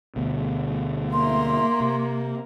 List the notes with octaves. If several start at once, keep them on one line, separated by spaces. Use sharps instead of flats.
D2 B2
A#3 E5 C6
C3